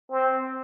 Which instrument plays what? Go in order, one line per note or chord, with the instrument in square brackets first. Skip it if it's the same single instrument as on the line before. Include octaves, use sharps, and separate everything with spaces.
[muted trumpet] C4